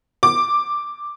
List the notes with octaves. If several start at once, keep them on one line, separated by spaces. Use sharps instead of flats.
D6